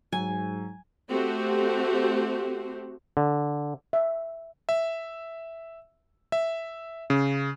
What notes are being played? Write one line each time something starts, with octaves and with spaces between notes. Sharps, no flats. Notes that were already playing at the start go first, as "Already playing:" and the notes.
G#2 F#3 G#5
A3 C4 F#4 G4 C5
D3
E5
E5
E5
C#3